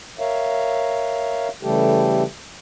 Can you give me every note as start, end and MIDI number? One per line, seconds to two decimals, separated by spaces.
0.19 1.48 70
0.19 1.48 73
0.19 1.48 76
0.19 1.48 77
1.63 2.23 49
1.63 2.23 52
1.63 2.23 55
1.63 2.23 57
1.63 2.23 67
1.63 2.23 69